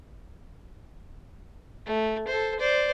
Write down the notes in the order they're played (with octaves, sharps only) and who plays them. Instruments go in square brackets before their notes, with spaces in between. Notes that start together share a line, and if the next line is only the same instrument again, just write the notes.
[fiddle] A3
A4 C5
C5 D5